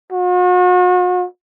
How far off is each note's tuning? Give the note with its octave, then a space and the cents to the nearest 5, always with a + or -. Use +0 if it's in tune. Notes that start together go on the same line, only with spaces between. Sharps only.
F#4 -40